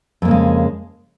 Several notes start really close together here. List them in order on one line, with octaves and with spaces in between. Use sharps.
F2 A#3 C#3 G#3